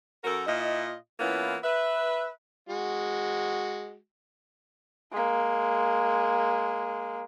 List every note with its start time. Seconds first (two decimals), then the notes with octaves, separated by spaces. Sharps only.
0.24 F#2 F#4 A4 A#4
0.46 A#2 E4 F4 D#5
1.19 E3 A#3 B3 C#4 E4 F4
1.63 B4 E5
2.69 G#3 F#4
5.12 G#3 A#3